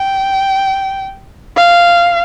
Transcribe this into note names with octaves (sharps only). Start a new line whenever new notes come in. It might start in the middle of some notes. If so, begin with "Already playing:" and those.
Already playing: G5
F5